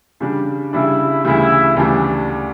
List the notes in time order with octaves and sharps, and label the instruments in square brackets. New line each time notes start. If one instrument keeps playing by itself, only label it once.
[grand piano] C#3 G3 D4
[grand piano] C#3 G3 D4 [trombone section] E4
[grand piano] D2 C#3 E3 G3 [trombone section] E4
[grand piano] D2 C#3 E3 G3 [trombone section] D4